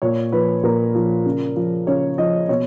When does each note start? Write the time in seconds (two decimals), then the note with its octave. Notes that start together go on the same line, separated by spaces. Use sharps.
0.02 A#2 C#5
0.32 F3 B4
0.63 A#2 A#4
0.95 F3
1.25 C#3
1.56 F3
1.87 C#3 C#5
2.18 F3 D#5
2.49 B2 C#5